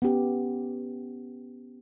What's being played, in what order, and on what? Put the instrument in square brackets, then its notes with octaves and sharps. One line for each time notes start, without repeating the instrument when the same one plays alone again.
[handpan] B3 C#4 G4